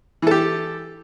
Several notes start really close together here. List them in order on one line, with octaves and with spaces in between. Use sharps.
E3 A4 G4